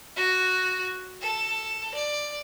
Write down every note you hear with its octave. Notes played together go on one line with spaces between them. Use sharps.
F#4
A4
D5